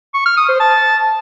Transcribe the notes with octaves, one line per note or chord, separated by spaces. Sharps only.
C#6
F6
D#6
C5
A5